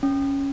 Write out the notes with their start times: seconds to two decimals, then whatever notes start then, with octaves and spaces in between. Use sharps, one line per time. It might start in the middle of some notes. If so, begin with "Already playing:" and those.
0.03 C#4